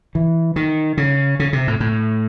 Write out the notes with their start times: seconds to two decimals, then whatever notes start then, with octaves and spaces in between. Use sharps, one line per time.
0.15 E3
0.56 D#3
0.97 C#3
1.40 C#3
1.53 C3
1.67 A2
1.80 A2